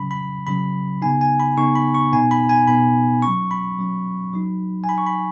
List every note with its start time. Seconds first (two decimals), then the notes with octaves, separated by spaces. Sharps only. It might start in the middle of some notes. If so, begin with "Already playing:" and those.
Already playing: C#3 F#3 C#4 B5
0.11 B5
0.47 C#3 F#3 C#4 B5
1.02 C#3 B3 D#4 G#5
1.21 G#5
1.40 B5
1.57 C#3 B3 D#4 C#6
1.75 B5
1.95 C#6
2.12 B2 B3 D#4 G#5
2.31 B5
2.49 G#5
2.68 B2 B3 D#4 B5
3.22 F#3 C#4 C#6
3.51 B5
3.79 F#3 C#4
4.33 F#3 D#4
4.84 G#5
4.88 F#3 D#4 B5
4.98 C#6
5.07 B5